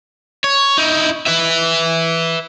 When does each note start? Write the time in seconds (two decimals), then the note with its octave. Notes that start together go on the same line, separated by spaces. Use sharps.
0.44 C#5
0.78 D#4 E4
1.26 B4 E5